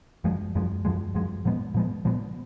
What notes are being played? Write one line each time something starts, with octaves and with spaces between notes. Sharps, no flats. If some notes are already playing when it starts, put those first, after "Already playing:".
F#2 F3 G#3
F#2 F3 G#3
F#2 F3 G#3
F#2 F3 G#3
A#2 F3 G#3 B3
A#2 F3 G#3 B3
A#2 F3 G#3 B3